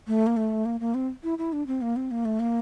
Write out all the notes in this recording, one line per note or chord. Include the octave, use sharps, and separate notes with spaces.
A3
A#3
A3
A#3
A#3
C4
E4
E4
D4
C4
A#3
C4
A#3
A3
A#3